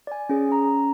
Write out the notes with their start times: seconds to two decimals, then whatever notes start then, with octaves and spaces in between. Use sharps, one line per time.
0.07 D5 G#5
0.29 C#4 G#4
0.49 C#4 A#5